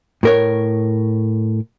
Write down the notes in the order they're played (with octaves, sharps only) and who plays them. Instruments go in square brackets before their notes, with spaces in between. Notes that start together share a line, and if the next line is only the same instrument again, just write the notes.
[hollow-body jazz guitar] A2 A#4 C#5